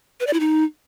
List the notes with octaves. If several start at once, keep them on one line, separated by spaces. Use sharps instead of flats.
B4
D5
E4
D#4